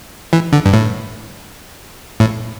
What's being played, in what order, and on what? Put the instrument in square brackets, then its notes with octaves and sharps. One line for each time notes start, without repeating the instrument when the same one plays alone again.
[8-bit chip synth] E3
D3
G2
A2
A2